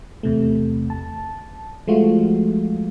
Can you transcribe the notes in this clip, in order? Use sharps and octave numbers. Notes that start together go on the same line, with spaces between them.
E2 C3 A3
A5
F3 G#3 A3 F4 F#4